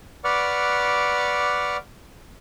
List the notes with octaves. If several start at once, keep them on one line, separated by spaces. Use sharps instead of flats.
B4 D5 F#5 C#6 D6 F6